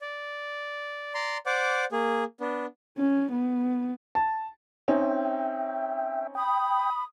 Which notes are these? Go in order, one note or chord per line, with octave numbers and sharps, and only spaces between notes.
D5
D5 A#5 C6
C5 D5 F#5 D6
A#3 G#4
B3 D4
C#4
B3
A5
C4 C#4 D#4 E5 G5
G5 B5 D#6